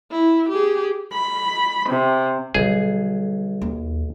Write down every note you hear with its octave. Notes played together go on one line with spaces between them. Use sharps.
E4
G4 G#4
B5
C3
B1 D3 G3 G#4
D#2